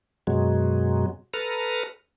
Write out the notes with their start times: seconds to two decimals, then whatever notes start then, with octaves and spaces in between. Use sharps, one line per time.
0.27 F#2 B2 F#3 G#3
1.34 A4 B4 A#5 F6